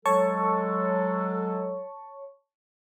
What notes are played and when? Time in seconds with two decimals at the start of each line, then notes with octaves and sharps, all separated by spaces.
0.06 F#3 G#3 A4 C#5 A5 C#6